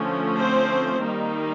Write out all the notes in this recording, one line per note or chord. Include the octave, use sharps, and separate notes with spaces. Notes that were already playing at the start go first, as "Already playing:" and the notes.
Already playing: D3 F3 A3 C#4
C4 C5
D#3 G3 A#3 D#4